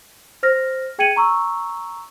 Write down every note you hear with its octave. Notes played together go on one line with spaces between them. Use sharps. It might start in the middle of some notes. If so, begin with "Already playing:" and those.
C5 F6 A#6
G#4 G5 G#6 C#7 D#7 F#7
A#5 C#6 E6